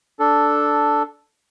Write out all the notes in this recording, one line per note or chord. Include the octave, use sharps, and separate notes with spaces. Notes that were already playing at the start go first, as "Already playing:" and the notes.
D4 A4